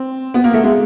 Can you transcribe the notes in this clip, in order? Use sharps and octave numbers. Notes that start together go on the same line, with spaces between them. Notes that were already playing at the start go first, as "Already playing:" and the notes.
Already playing: C4
B3
A#3
A3
G#3